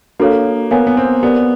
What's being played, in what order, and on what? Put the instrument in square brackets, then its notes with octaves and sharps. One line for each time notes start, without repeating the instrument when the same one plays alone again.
[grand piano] A#3 [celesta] D4 F#4 A4 C#5 F5
[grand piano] B3 [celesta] A#4 C#5 F5 G#5
[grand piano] B3
C4
[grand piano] B3 [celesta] G4 A#4 D5